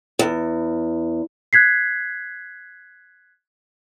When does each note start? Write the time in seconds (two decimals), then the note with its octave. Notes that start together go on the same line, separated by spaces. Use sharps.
0.19 E2
1.53 F#6 G#6 B6 C7